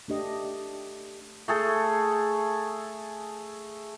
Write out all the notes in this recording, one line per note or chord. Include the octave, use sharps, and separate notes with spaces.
A3 D4 G4 D#5
A3 G#4 A4